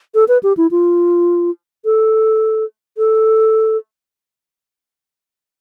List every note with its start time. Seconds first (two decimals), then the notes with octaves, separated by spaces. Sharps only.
0.15 A4
0.28 B4
0.43 G4
0.57 E4
0.71 F4
1.85 A4
2.98 A4